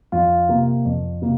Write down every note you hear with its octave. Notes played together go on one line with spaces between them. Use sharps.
F2 F4
C3 A#3
F2
C3 A#3